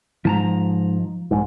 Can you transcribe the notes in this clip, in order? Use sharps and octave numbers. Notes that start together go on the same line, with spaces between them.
G#2 F3 A5 A#5
A#1 G#2